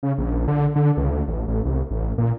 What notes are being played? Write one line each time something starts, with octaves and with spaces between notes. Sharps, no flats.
C#3
A#1
D3
D3
C#2
D2
A1
A1
C2
A1
A#2